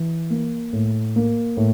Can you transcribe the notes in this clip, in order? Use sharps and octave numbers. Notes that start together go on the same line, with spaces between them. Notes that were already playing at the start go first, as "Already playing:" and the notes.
Already playing: E3
A#3
A2
A#3
A2